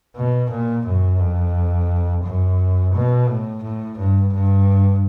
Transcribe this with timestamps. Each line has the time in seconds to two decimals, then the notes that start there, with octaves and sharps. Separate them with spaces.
0.16 B2
0.50 A#2
0.86 F#2
1.20 F2
2.24 F#2
2.94 B2
3.29 A2
3.63 A2
3.98 G2
4.33 G2